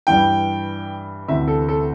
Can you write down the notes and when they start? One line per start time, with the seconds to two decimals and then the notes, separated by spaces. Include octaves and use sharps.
0.07 G2 E3 G5
1.28 D2 C3 E3 E5
1.48 A4
1.68 A4